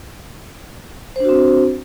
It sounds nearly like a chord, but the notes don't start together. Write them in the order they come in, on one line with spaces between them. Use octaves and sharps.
C5 D4 F#4 C4